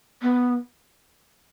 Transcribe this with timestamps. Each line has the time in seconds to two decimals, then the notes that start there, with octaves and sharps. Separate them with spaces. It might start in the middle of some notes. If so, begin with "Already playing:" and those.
0.22 B3